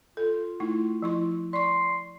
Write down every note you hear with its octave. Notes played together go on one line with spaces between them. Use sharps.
F4 A4
A3 D#4 E4
F3 E4 C6
D5 C6 C#6